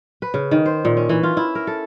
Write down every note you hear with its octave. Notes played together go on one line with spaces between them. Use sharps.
B4
C#3
D#3
C5
A#2
C#4
E3
F4
E4
A#4
A4